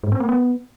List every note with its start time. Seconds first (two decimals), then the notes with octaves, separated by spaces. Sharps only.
0.03 G#2
0.12 C4
0.20 A#3
0.29 B3